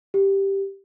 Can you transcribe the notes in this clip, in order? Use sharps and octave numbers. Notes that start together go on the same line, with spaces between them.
G4